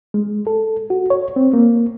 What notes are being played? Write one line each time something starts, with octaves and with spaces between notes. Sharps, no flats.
G#3
A4
F#4
C#5
C4
A#3